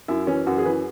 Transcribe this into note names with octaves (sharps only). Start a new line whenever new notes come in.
F#2 E4
E3 C#4
F#2 F#4
G#4
E3 B4